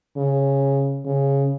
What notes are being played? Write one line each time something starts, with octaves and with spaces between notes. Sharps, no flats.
C#3
C#3